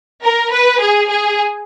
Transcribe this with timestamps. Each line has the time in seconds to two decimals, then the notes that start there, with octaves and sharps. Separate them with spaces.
0.23 A#4
0.52 B4
0.80 G#4
1.08 G#4